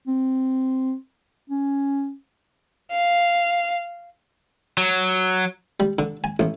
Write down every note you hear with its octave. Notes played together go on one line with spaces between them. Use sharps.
C4
C#4
F5
F#3
G3
D3
G#5
A1